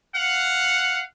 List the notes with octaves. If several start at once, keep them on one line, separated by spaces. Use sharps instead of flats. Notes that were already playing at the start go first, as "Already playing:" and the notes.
F5 F#5